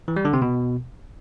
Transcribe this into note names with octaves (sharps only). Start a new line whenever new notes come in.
E3
G3
D3
C3
B2